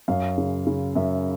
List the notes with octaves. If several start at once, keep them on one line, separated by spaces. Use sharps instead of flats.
F#2 F5
C#3
C#3
F#2 E5